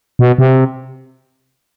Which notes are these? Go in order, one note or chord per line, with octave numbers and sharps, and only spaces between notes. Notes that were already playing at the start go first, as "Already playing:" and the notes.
B2
C3